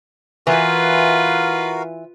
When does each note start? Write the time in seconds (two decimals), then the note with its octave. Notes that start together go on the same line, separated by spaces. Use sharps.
0.47 E3 F4 F#4 A#4 B4 F5